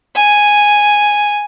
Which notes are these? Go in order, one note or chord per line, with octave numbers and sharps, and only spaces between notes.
G#5